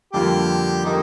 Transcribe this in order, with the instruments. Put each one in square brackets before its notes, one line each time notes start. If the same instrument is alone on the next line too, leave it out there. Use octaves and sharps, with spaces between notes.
[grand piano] F2 D3 G3 A#3 F4 [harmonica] G4
[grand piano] D3 G3 A#3 [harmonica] D#4